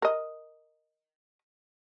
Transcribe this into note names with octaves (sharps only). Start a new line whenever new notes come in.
A#4 D#5